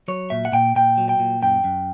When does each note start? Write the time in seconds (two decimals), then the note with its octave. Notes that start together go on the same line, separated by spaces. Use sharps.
0.08 F#3 C#5
0.30 A#2 E5
0.45 F#5
0.52 A#2 G5
0.75 A#2 G5
0.98 F#3
1.09 G5
1.19 A#2
1.42 F#2 G5
1.64 F#2